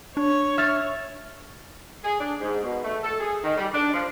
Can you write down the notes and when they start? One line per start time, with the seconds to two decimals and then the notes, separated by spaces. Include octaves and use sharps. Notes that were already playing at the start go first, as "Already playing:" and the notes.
0.17 D4 C#5
0.57 E5 F6 A6
2.03 G#4
2.19 D4
2.40 G#2
2.63 B2
2.84 A3
3.02 A4
3.20 G#4
3.44 D#3
3.57 G3
3.73 D4
3.94 F3